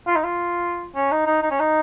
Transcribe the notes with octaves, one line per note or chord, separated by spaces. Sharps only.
F4
D#4
F4
C#4
D#4
D#4
D#4
C#4
D#4